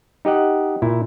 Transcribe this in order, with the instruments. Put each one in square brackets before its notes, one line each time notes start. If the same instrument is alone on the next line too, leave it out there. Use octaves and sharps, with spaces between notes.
[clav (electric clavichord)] D#4 G4 D#5 F#5
A#2 E4